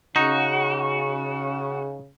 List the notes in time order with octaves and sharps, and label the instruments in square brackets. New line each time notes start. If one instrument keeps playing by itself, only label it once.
[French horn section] C#3 [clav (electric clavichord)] D#4 [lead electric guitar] F#4